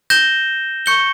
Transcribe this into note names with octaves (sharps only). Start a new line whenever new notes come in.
G6 A#6 E7 G7
C#6 G6 C#7 G7